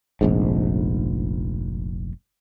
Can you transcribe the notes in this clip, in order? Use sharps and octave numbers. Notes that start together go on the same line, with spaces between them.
F1 A#1 G#2